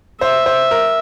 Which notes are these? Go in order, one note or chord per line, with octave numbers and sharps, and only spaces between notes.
C5 E5
C5
A#4